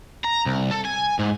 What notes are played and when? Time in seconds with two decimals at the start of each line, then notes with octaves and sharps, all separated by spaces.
0.24 A#5
0.46 C2
0.71 A4
0.85 G#5
1.19 G#2